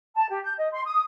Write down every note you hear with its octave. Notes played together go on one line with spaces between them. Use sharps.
A5
G4
G6
D#5
C6
D#6